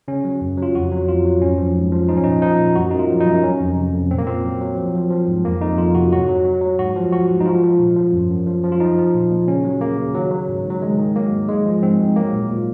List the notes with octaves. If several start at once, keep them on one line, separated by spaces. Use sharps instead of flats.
C#3 C#4
F#3
F#2
F#3
F4
F2 F#4
F#3
F2 F4
F#3
G#2 C#4
F3
G#2
F3
F3 D#4
C#4
A#2 D#4
F3 D#4
A#2
F#2 F#4
F#2 D#4
F4
F3
D#4
F#2
F#3 C#4
F2
C3
F2
A#2 C4
A#3
A#2 C4
F#3
F#3
F3
F3
F3
G#2
F2 A#3
F2 D#4
F2 F4
C3 F#4
F#3 F#4
F#3
F#3
F#3
G#2 F#4
F3
F3 F#4
G#2
D#4
F3 F4
F3
A#2
F3
F#2
F#2
F3
F3
F4
F3 D#4
F3
A#2
A#2
C#3 C#4
F#3
C#3 A#3
C#3
D#3 F#3
F#3
G#2
G#2 F#3
D#3 G#3
D#3
F#3 A#3
G#2
G#2 G#3
F3
G#2 C4
G#2
F#3 A#3
A#2
A#2